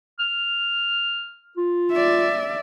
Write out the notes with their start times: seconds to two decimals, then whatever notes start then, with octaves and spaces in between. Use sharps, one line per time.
0.19 F6
1.57 F4
1.92 D5 E5